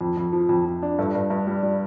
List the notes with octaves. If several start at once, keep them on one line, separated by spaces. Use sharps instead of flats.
F2
F2
F3
F2
F2
D4
G2 A4
G2
G2
G3
G3